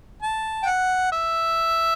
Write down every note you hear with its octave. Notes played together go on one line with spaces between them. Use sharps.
A5
G5
F#5
E5